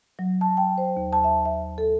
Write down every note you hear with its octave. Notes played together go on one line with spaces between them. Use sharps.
F#3
A5
G5
C5
D#2
A5
E5
E5
A4